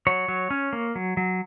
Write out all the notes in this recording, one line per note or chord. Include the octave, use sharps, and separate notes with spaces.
F#3 C#5
F#3
C#4
A#3
F#3
F#3